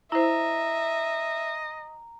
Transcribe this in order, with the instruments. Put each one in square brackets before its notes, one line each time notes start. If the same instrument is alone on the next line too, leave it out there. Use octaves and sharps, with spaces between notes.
[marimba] E4 C5 [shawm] D#5 [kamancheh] E5 [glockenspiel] A#5